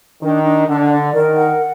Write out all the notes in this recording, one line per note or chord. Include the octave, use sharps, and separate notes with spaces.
D#3 D4
D4
D3 D4
D5
D#3 A#4
F#5